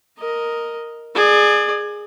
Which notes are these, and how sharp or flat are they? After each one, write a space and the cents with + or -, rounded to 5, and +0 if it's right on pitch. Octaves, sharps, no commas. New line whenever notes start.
A#4 +0 D#5 +0
G#4 +0 D5 +30